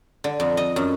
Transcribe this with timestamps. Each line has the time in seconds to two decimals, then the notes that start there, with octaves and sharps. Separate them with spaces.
0.24 D3
0.40 F2
0.57 D#5
0.76 F#2